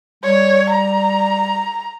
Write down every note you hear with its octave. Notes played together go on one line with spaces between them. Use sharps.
G3 C#5
A#5